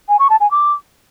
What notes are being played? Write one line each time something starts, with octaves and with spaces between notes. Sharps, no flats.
G#5
C#6
A5
G#5
D6